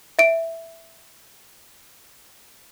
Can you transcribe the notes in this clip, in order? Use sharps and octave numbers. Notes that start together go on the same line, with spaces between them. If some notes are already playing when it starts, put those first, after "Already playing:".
E5 D7